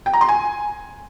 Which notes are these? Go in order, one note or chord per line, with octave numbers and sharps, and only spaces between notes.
G5
A#5
C6
G#5